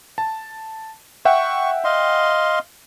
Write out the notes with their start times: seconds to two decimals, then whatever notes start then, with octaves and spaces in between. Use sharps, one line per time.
0.18 A5
1.25 E5 F#5 G5 C#6
1.84 D#5 F5 C6